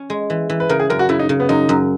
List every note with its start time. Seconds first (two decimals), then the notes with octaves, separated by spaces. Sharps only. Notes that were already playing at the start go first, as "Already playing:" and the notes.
Already playing: C#4
0.10 G#3
0.30 E3
0.50 E3
0.60 B4
0.69 C#3 A#4
0.80 G#4
0.90 F#2 A#4
0.99 F#4
1.09 C#3 E4
1.19 D#4
1.29 C#3
1.40 B3
1.49 F#2 D#4
1.69 F#2